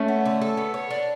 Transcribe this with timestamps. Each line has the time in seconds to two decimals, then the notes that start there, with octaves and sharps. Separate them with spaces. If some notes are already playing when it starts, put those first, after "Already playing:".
Already playing: A3 C#4
0.08 B3
0.25 D3
0.41 A4
0.57 B3
0.74 C#5
0.90 D4